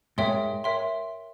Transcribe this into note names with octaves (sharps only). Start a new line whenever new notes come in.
G#2 A#4 C#5 E5 G5 C6
A#4 C#5 E5 G5 C6